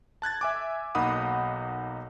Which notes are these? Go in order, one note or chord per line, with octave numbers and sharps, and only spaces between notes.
A5 F#6 G#6 A6
E5 G#5 D6
B1 A#3 D#4 F#5 B5 D#6